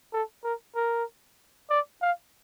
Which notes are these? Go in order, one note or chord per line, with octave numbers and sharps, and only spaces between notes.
A4
A#4
A#4
D5
F5